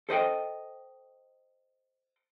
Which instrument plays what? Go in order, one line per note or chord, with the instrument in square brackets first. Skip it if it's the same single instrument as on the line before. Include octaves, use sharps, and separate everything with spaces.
[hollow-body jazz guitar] A4 C5 D#5 G5